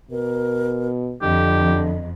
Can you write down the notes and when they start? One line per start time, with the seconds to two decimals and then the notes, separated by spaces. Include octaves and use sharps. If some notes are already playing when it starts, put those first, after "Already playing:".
0.11 B2 A#4
1.22 F2 D3 G4 D#5